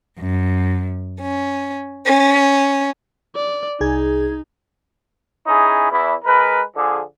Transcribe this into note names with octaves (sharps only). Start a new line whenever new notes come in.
F#2
C#4
C#4
D5
C2 D#4 G#4 G#6
C#4 D#4 E4 G#4
E2 E4
G#3 A#4 B4
D3 F3 G#4